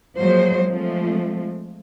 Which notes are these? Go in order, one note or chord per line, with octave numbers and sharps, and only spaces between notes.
F3 F#3 G#3 A#3 C5
F3 G#3 A3 C4